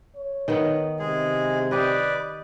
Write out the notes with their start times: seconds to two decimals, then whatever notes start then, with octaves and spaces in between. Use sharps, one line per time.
0.16 C#5
0.48 D#3 B3
0.99 C3 G#3 G#4
1.71 G4 B4 D5 D#5